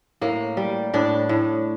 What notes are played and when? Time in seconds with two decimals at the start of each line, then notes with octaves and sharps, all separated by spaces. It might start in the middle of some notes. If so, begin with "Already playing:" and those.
0.21 A2 A#3
0.57 G3
0.94 A2 D4
1.29 A2